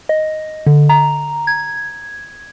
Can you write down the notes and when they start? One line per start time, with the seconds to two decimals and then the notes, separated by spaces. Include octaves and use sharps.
0.09 D#5
0.67 D3
0.89 A#5
1.47 G#6